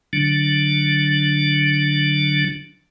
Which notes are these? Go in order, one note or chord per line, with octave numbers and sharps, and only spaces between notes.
D3 F#3 D4